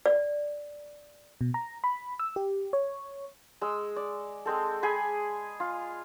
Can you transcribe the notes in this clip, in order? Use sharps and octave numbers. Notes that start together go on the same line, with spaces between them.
D5
B2
A#5
B5
E6
G4
C#5
G#3 E6
D5
G#3 C4 A4
G#4 G#5 B5
F4